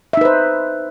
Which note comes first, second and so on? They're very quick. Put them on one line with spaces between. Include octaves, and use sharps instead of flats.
E5 D#4 B4 C5